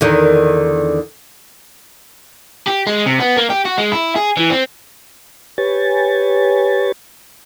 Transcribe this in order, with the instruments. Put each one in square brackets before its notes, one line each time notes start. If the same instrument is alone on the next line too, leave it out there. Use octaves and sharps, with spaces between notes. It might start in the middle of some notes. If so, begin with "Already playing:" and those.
[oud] E2 D3 D#3
[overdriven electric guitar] G4
G#3
C3
B3
A#3
G4
F#4
G#3
E4
G#4
E3
C4
[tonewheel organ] G4 B4 C#5 G#5 A6